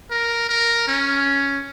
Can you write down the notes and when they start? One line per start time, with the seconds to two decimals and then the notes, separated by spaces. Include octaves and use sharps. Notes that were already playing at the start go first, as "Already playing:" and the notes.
0.11 A#4
0.49 A#4
0.88 C#4